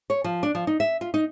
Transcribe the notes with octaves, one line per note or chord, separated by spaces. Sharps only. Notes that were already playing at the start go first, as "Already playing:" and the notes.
C#5
F3
D4
F3
D#4
E5
F4
D#4